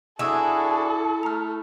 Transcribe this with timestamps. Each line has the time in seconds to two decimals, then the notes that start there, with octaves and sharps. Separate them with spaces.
0.19 D4 E4 F#4 G#4 A4 G#5 D#6 E6
1.23 A3 A#5 F6